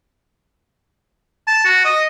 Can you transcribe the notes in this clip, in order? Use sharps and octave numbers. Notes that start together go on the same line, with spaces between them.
A5
F#4
D#5